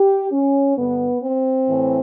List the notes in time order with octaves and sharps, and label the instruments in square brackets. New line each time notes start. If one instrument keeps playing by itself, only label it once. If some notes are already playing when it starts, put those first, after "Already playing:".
Already playing: [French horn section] G4
C#4
G2 D3 B3
C4
A2 E3